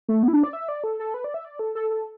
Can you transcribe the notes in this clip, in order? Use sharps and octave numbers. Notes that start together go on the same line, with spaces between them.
A3
B3
E4
D4
D5
E5
D5
A4
A4
B4
D5
E5
D5
A4
A4
A4